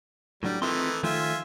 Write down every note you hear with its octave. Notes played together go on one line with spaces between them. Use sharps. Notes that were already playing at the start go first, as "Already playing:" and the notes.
A2 F#3 G3 D4
D#3 E3 A3 C4 F4 C6
D#3 F3 A3 F4 E5 G#5